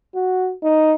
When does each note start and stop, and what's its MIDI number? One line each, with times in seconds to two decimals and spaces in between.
0.14 0.53 66
0.63 0.95 63